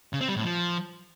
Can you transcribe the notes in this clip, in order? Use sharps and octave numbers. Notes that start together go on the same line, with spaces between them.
C#3
C4
G3
A2
F3